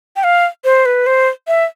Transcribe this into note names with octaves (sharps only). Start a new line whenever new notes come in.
G5
F5
C5
B4
C5
E5